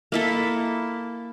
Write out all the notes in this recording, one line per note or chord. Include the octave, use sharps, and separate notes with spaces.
A#3 E4 A4